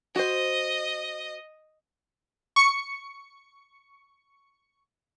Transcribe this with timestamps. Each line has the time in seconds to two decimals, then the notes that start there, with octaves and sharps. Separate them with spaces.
0.16 F#4 C5 D#5
2.56 C#6 C#7